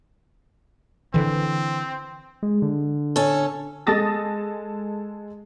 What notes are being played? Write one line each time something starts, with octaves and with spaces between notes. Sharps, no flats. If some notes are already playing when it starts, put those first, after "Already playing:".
D3 E3 C4
G#3
D3
C#4 A4
G#3 A4 A5 D#6 A6 A#6